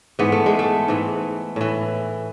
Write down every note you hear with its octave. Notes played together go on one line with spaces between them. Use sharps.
G#2 E3 B3
A3
G#3
A3
G#2 E3
A2 E3